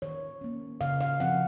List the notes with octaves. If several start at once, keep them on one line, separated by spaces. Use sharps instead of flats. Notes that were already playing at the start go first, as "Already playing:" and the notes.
D#3 C#5
A#3 C#4
C#3 F5
F5
F3 C4 F#5